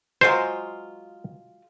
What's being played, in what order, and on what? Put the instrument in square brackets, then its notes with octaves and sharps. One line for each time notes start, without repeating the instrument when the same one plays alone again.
[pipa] F#3 G#3 F4 [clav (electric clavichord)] C5